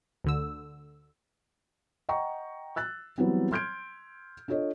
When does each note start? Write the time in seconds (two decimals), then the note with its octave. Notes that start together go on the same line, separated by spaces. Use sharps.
0.24 D2 D3 E6
2.09 D#5 F#5 G5 A#5 C#6
2.76 E6 F#6 A6
3.18 E3 F#3 G3 B3 C4
3.52 C6 F6 G6 G#6 D7
4.48 D4 F4 A4 C#5 D#5